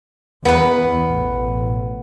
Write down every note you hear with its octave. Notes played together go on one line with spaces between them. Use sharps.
E2 B3 B4
A1 B2